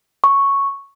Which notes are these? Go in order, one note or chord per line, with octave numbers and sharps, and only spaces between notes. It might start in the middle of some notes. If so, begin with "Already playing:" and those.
C#6